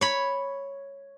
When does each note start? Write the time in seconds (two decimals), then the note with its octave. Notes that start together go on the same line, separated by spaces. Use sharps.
0.01 C#5 B5